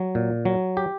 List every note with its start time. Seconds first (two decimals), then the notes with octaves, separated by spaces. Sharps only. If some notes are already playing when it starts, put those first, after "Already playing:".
Already playing: F#3
0.15 A#2
0.45 F#3
0.77 G4